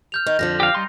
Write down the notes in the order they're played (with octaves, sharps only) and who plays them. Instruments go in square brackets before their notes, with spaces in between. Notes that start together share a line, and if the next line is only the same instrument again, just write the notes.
[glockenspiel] F6 G6 F7
[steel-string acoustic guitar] D#3
[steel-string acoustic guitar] F2 D3 F3 [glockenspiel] A#6
[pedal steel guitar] G4 F5
G3 D#4 C6